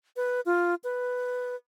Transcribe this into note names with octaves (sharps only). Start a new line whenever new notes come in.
B4
F4
B4